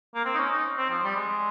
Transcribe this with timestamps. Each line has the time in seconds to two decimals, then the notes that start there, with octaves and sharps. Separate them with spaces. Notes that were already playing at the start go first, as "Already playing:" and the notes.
0.15 A#3
0.25 C4
0.34 D#4
0.38 C#4
0.52 D#4
0.77 C4
0.90 F3
1.04 G3
1.16 G#3